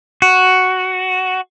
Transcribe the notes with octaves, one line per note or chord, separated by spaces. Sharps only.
F#4